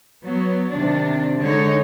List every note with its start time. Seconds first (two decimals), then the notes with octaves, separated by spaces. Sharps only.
0.24 F#3 B3
0.71 C3 D#3 D4
1.39 D3 G#3 D#4 C#5